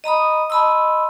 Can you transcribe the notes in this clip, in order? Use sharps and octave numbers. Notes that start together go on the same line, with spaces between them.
D#5 A#5 B5 D#6
D#5 A5 B5 C6 E6